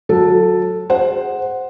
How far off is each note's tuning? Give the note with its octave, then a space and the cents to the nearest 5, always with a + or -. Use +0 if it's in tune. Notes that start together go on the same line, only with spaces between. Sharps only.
F#3 -25 A4 +0
G#4 -10 C5 +0 F#5 +0